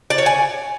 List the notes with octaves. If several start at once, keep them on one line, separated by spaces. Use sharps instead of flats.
D5
C#5
G#5